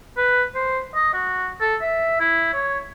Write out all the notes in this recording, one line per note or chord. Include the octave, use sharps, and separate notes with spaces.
B4
C5
D#5
F#4
A4
E5
E4
C#5